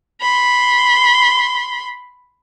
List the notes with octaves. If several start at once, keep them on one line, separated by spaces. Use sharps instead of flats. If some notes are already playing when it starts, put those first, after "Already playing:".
B5 C6